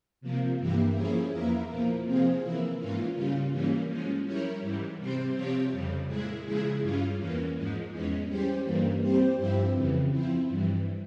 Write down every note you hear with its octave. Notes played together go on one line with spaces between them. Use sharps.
C3 F3 A#3
G2 E3 A#3 E4 G4
F3 A#3 C#4 E4 G#4
E2 E3 A#3 E4 A#4
A#2 F3 A#3
C3 F3 C4 F4 G#4
E3 A#3 E4
G#2 E3 A#3 C#4 F4
C#3 G3 C#4 F4
G#2 E3 G3 A#3 C#4
F3 G#3 C#4
G3 C#4 E4 A#4 C#5
G#2 E3 G3
C3 G3 C4 G4 C5
C3 F3 C4 G4 C#5
F2 C#3 G3
A#2 G#3 E4 G#4
C#3 F3 G#3 E4 G#4
G2 G3 C#4 F4
E2 E3 A#3 C#4
G#2 F3 G#3
E2 E3 G#3 C#4
G3 C#4 G4 C5
G2 E3 G3 A#3
G3 C4 G4 C5
G2 F3 C4 E4 G4
F2 C#3 E3
F3 C4 E4
G2 E3 G3